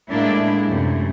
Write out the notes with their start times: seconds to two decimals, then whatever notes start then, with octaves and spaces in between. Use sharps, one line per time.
0.10 A2 G#3 A#3 D4 E4
0.66 F#2 C3 A3